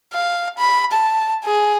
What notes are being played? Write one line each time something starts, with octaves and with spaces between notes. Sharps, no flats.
F5
B5
A5
G#4